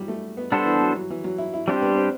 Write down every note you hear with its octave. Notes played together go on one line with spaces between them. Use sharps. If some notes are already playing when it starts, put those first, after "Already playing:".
Already playing: E3 F#3 G3
A3
B3
G3 B3 D4 A4 C5
E3
F#3
F#3
E3
F#3
E4
E4
G3 C4 D4 G4 C5
B3
C4